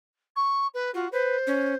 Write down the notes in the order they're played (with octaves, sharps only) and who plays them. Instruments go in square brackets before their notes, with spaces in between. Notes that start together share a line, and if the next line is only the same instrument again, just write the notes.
[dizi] C#6
B4
[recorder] F4 [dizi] F#4
[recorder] B4 [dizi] C5
[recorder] C#4